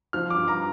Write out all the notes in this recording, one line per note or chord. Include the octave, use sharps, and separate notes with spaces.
F3 F6
D6
G2
A#5